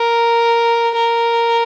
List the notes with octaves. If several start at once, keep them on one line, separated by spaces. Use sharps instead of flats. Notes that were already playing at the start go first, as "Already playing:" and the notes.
Already playing: A#4
A#4